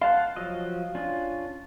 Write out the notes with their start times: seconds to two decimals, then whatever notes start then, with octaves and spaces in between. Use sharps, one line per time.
0.01 F5 F#5 A5 C6
0.36 F3 F#3 D#5
0.95 C#4 D4 F4